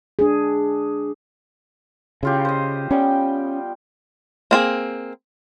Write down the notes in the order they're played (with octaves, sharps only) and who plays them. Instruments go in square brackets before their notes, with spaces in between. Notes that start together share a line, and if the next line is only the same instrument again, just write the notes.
[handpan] D4 G#4
[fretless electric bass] C#3 [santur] E4 F4 G4
[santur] C5 D#5
[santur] G3 B3 G5 [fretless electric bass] C#4
[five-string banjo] A#3 C4 G#4